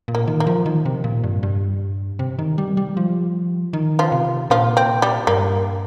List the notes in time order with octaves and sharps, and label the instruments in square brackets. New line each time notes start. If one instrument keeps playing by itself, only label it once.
[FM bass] A#2
[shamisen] A#3
[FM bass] D#3
[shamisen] A#3
[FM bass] F3
D#3
C3
A#2
G2
G2
C3
D#3
G3
G3
F3
D#3
[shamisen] F3 F4
[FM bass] C3
[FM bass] A#2 [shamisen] F3 F4
[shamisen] C4
G3
[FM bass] G2 [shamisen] A#3